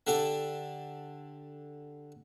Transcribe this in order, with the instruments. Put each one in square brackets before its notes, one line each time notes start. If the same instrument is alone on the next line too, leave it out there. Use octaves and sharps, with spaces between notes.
[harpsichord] D3 G4 A4